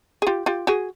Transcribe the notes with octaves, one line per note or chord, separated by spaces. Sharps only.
G#4
F4 G4
F4 G4
F#4 G#4